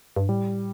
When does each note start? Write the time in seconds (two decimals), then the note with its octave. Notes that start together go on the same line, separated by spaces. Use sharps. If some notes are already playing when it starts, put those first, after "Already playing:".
0.16 G2
0.29 A2 G3